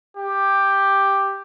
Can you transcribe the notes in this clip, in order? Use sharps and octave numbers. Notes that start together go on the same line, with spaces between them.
G4